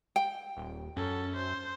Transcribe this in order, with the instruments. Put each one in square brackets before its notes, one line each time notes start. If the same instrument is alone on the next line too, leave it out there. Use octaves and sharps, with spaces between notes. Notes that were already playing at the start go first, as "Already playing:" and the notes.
[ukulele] G5
[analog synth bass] D#1
[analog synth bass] F#2 [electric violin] C#4 A4
[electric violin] C5